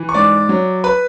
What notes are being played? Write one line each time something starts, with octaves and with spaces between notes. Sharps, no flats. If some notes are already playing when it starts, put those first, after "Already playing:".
Already playing: E3
C#6
G#2 D5 D6
F#3
B4 B5